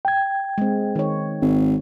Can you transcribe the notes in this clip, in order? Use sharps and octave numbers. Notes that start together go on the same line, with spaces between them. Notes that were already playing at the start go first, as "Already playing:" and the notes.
G5 G#6
G#3 C4
D#3 C#5
G#1